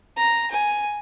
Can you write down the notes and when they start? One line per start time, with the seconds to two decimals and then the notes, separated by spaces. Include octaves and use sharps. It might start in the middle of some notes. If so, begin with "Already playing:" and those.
0.17 A#5
0.51 G#5